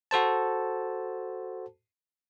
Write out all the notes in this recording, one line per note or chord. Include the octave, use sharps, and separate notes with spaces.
F#4 A4 C5 A5